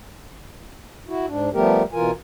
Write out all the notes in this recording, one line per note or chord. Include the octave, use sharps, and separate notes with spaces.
E4 F#4
G#2 D4
F3 G3 A3 B3 G4 A#4
B2 E3 F4 A#4 G#5